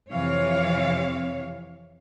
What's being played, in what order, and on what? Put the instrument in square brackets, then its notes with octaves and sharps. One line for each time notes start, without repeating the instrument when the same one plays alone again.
[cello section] F2 C3 E3 C#5 F5